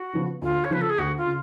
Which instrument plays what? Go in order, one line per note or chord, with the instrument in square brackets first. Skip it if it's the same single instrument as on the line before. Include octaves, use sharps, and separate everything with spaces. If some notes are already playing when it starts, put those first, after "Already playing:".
Already playing: [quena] F#4
[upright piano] C#3 F3 B3 F4
[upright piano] D2 [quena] F4
[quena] C#5
[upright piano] C#3 F3 B3 F4 [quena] B4
[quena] A4
G#4
[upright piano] D2 [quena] F#4
[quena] F4
[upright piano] C#3